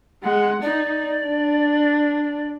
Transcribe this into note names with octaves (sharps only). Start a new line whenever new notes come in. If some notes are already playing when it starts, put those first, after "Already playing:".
G#3 F#5
D#4 D5
D4